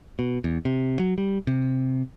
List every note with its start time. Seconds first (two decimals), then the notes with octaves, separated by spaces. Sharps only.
0.19 B2
0.44 E2
0.65 C3
0.99 F#3
1.18 G3
1.47 C3